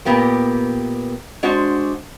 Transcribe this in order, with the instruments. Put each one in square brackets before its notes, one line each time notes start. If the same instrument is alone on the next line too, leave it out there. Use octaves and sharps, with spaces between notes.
[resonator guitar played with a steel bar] A#2 B3 G4 A#4
G#3 D4 F#4 C5